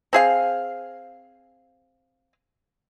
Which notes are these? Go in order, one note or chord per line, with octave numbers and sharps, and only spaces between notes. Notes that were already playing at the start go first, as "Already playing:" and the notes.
C4 G#4 F5